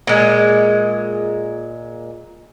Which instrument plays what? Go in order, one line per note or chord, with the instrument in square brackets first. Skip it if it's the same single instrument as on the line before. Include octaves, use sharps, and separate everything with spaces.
[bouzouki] A#2 G#3